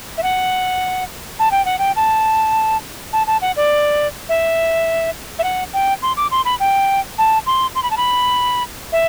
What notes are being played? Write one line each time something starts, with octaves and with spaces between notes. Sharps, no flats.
E5
F#5
A5
G5
F#5
G5
A5
A5
A5
F#5
D5
E5
E5
F#5
G5
C6
D6
C6
B5
G5
A5
C6
C6
B5
A5
B5
E5